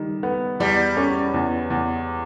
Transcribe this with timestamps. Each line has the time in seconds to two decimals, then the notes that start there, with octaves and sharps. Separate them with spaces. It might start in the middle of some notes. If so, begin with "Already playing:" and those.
Already playing: D#3 G3
0.23 B3
0.60 E2 G3
0.97 C#4
1.34 E2
1.70 E2